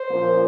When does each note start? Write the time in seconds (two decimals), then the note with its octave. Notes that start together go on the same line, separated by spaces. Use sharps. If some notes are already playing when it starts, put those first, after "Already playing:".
Already playing: C5
0.10 A#2 F3 A#3 C#4